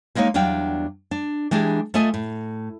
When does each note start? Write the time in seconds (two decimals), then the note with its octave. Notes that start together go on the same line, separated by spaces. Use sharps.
0.15 G3 G#3 A#3 D#4 C#5
0.34 E2 F#3 G3 D4 F5 G5
1.11 D4
1.51 E3 G#3 D4 G4 G#4
1.94 A3 F4 A4 D#5 E5 G#5
2.14 A2